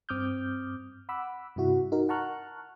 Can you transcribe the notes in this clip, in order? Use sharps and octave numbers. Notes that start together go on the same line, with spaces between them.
G2 C4 D6 D#6 F6 G6
F#5 B5 D6 E6
G2 C3 E4 F#4
D#4 F#4 A#4
F#5 A5 A#5 C#6 F6 F#6